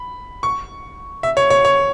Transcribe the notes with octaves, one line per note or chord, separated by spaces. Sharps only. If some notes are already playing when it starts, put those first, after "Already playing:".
Already playing: B5
C#6
E5
C#5
C#5
C#5